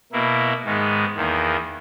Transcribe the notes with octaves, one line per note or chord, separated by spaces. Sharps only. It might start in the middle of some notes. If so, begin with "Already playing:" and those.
B2 A#3 E4
G#2 D#3 G#3 B3
E2 D#3 A#3